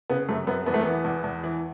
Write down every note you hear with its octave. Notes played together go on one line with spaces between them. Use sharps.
C#3 B3
F#2 A3
F#2 B3
E2 B3
A3
E3 B3
E2
E2
E3